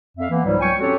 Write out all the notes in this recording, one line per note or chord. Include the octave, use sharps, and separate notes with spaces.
F2 E5 F5
E3 A#3 B3
C#2 G#2 F#3 G3
C#2 F#3 C#5 G5 G#5 C#6
C4 C#4 F#4 G4 A4 C#5